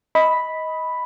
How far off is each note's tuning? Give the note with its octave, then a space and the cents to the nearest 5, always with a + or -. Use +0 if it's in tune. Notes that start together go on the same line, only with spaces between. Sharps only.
D#5 +20 B5 +0